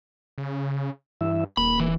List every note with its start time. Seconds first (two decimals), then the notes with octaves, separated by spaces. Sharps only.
0.38 C#3
1.21 G2 E3 E4 E5
1.57 D#1 A#3 B5
1.80 E3